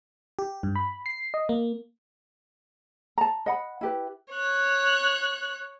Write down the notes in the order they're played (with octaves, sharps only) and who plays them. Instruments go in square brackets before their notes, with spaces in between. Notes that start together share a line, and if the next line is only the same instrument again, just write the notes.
[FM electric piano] G4
G2
B5
C7
D#5
A#3
[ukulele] A5 A#5
D#5 F#5 B5
E4 G4 B4
[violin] C#5 F#6